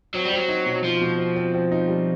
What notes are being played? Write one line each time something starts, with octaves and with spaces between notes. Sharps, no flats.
F#3 C4
G3
F#3 C4
D#4
B2
F3 C4
B2
C4
C4
C4
D#4
G3